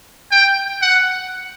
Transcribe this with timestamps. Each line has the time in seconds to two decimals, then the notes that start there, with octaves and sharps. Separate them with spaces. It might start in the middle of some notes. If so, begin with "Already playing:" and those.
0.32 G5
0.82 F#5